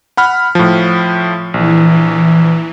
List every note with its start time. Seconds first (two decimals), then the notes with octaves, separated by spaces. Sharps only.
0.17 F#5 B5 F6
0.55 A2 F3
1.54 A#1 E3